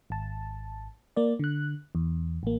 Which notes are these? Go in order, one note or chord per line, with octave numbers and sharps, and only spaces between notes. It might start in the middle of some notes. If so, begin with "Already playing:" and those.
G#1 A5
A#3 D5
D3 F#6
E2
A1 A#3